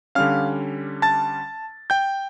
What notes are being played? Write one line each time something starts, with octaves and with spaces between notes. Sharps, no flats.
D3 G3 C#4 F5 F6
A5 A6
G5 G6